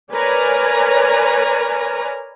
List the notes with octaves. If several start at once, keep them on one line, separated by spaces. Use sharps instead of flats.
A#4 B4 C#5 D5 G#5 A#5